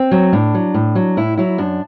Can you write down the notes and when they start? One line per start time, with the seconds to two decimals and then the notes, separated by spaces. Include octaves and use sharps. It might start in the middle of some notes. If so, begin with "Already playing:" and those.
Already playing: C4
0.11 F#3
0.33 A2 D4
0.54 F#3
0.74 A2
0.95 F#3
1.17 A2 E4
1.37 F#3 E4
1.58 F#2 D4